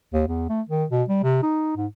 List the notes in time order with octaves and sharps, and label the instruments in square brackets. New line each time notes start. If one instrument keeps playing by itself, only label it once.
[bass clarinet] D#2
E2
A3
D#3
B2
G3
C3
D#4
G#2